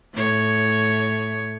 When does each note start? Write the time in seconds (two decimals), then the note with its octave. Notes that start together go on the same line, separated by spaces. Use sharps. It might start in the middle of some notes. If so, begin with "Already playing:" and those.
0.14 A2 C#5